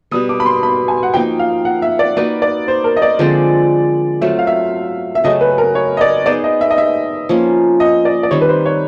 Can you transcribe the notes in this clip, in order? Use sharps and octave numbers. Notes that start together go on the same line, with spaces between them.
B2 G3 B3 D#6
D6
B5
C6
B5
G#5
F#5
F3 A#3 D#4 G5
F5
F#5
E5
D5
A#3 D#4 F#4 B4 D5
D5
C5
A#4
D#5
D5
D3 F3 G#3 C4
F#3 A3 C4 F4 E5
F5
E5
E5
C#3 F#3 A3 C#4 D#5
B4
A#4
C#5
D#5
D5
B3 D#4 G#4 C5 D5
D#5
E5
D#5
E5
F3 A#3 C#4
D#5
D5
D5
D#3 G3 C4 C#5
B4
C5
C#5